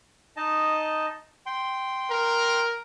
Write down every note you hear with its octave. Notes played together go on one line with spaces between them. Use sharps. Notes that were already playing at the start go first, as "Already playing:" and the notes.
D#4 D#5 A5
G5 C6
A#4